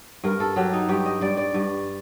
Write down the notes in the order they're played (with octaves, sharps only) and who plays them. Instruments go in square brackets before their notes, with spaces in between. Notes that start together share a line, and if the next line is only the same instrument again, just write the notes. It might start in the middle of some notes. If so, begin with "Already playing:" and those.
[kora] G2 A#4
A4
F#3 G4
D#4
G2 G4
D#5
G2 D5
D5
G2